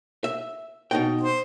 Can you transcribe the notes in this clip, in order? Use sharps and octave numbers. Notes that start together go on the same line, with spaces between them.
E5
B2 D#4 G5
C5